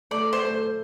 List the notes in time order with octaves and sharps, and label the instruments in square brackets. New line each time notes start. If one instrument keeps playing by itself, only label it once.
[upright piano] A3 [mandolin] D5
[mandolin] C5
[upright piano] A3